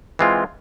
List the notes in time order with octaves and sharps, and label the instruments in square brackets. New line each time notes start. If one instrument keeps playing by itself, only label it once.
[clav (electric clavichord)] E3 G#3 C4 F4